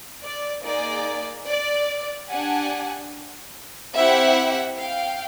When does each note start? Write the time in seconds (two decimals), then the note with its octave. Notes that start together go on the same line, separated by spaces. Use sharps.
0.22 D5
0.63 A#3 D#4 G#4 D5
1.47 D5
2.29 D4 G4 F#5 G#5
3.95 C4 E4 G4 E5 F#5
4.79 F5 G5